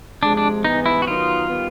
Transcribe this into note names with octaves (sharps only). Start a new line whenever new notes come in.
C3 F3 G#3 D4
D4
G#2 E3 G3 B3 D#4
E4
F#4
D#3 F#3 B3 D#4 F4
D#3 G3 B3